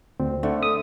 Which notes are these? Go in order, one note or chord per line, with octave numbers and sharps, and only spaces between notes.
D2 C4
D3 A3
E5 D#6